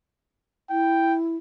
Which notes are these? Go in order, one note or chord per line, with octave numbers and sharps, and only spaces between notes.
E4 G5